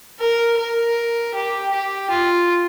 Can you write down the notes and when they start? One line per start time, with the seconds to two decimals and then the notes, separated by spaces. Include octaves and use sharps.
0.20 A#4
0.58 A#4
1.34 G4
1.72 G4
2.10 F4